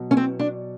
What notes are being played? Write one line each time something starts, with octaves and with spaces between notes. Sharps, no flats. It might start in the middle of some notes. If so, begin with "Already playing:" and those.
Already playing: B2 F#3
C#4
C4
D4